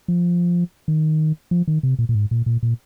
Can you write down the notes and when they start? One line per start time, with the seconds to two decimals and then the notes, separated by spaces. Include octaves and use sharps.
0.08 F3
0.88 D#3
1.51 F3
1.68 D#3
1.83 C3
1.99 A#2
2.09 A#2
2.15 G#2
2.31 A#2
2.46 A#2
2.63 A#2